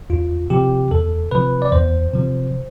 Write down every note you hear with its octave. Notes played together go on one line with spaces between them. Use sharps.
E2 F4
C3 F3 G4
E2 A4
C3 F3 B4
D5
E2 C5
C3 F3